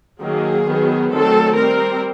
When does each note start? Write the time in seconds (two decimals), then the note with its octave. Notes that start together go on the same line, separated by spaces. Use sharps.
0.21 D#3 F#3 A#3 G#4
0.66 D#3 F#3 B3
1.12 D#3 F#3 A3 C4 A4
1.56 G3 C4 A#4